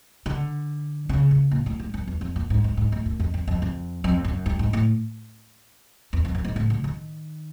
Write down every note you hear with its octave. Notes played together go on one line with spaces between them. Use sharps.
D3
C#3
C#3
A#2
A2
G#2
F#2
E2
F2
A#2
G#2
G#2
G#2
A2
F#2
F2
F2
F2
F2
F2
F#2
G2
G#2
A2
E2
F2
F#2
G#2
A2
D3
D#3